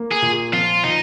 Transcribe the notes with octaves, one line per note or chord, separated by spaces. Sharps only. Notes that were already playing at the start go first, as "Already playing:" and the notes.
Already playing: A#3
G#4
A#2
F3 F4
A#2 D#4